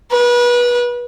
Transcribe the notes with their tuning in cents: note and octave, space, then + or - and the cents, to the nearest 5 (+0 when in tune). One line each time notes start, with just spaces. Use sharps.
B4 -30